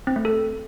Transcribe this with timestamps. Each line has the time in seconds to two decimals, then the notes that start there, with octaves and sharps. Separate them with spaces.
0.07 C4
0.16 A3
0.25 A4